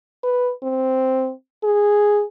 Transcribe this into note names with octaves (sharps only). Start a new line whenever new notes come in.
B4
C4
G#4